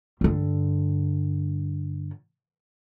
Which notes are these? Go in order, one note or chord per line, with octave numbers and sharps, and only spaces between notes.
G2 D3